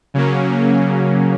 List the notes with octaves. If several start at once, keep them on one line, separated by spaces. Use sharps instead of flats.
C#3 F#3 A#3 C#4